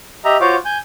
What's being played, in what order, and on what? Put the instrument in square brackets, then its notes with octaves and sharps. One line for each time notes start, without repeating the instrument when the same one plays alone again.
[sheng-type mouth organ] G4 D#5 E5 A#5
F4 F#4 C5 C#5 F5 D6
G#5 G6